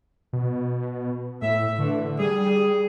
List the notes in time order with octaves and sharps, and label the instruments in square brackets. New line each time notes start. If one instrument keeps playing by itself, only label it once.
[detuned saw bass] B2
[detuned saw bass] A2 [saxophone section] E5
[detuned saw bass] D3 [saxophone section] E3 A3
[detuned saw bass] G3 [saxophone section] G#4